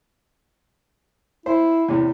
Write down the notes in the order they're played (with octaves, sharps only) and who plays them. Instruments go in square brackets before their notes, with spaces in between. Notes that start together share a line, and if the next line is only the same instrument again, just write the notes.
[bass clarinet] E4 [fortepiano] C5
[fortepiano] E2 A2 C3